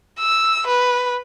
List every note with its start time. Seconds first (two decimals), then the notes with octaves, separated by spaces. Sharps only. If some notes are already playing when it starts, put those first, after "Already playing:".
0.20 E6
0.67 B4